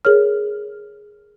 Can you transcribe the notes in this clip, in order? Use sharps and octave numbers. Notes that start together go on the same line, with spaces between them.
G#4 A#4 C#5 F6